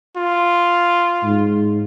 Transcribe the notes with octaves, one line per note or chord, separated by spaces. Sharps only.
F4
G#2